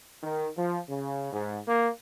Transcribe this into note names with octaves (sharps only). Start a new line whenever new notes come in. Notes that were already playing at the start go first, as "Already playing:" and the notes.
D#3
F3
C#3
G#2
A#3